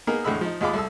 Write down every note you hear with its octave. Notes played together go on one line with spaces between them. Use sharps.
A#3 B3 D#4 G#4 A#4
E2 A2 D3 G#3 B5 E6
F3 D#4
D#2 G#3 F4 B5 D6
C2 A4 E6